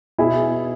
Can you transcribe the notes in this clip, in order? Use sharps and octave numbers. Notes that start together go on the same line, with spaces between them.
B2 E4 G#4